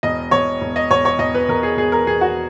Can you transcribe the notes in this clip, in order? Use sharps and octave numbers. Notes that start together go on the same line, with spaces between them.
E1 D#5
E1 C#5
E1
D#5
E1 C#5
C#5
E1 D#5
B4
E1 A#4
G#4
E1 G#4
A#4
E1 G#4
F#4